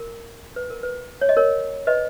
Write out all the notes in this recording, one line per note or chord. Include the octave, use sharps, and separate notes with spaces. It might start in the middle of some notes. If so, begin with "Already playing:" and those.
Already playing: A#4
B4
A#4
B4
C#5
D#5
A#4 C#5
B4 D#5